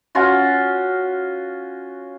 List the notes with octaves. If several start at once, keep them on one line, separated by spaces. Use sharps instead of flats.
C#4 F4 F#4